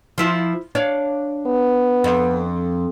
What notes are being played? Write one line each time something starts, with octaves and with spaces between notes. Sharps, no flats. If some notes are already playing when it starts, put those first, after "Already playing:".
F3 E4 F4
D4 C#5 F5
B3
F2